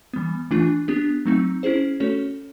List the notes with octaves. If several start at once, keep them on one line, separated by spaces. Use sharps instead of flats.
E3 G3 B3
E3 A3 D4 F4
B3 D4 G4
F#3 A3 C4 D#4
C#4 E4 G#4 C5
A3 C#4 F#4 A4 C#5